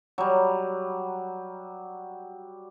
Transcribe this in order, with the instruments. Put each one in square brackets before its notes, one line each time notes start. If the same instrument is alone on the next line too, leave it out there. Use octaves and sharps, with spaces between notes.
[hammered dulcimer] F#3 G3